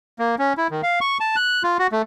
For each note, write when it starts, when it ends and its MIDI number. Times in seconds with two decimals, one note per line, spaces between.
0.19 0.35 58
0.39 0.53 61
0.57 0.67 64
0.70 0.81 51
0.83 0.99 77
1.01 1.18 85
1.20 1.36 81
1.36 1.63 90
1.63 1.77 65
1.79 1.87 66
1.92 2.02 57